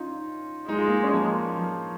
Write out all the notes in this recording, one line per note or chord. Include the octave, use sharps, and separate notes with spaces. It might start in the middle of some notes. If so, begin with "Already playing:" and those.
Already playing: C#4 D#4 F4
G#3 D#4
F4
A#3 D#4
C#4
F3 A#3
F3